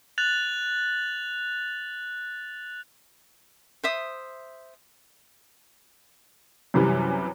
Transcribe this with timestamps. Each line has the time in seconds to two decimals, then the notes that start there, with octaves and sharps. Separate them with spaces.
0.18 F#6 A6 F7 F#7
3.84 C5 E5 D#6
6.74 F#2 C3 E3 G3